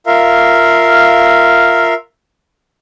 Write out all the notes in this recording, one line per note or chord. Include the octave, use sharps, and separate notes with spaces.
F4 A#4 E5 F5